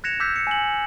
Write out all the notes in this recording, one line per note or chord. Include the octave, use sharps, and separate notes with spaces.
F#6 G#6 A#6 C#7 E7 F7
D6 E6 F#6 G6 A#6 B6
G6 C#7
G#5 F#7